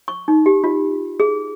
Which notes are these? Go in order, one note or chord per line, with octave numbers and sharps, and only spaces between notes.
C#6
D#4
G4
F4
G#4